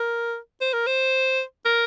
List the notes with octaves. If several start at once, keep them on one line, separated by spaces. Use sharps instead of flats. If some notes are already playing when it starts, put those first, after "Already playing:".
Already playing: A#4
C5
A#4
C5
A#4